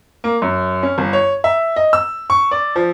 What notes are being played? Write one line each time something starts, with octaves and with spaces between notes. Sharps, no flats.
A#3
F#2
C#4
G1
C#5
E5
D#5
E6
C#6
D5
F3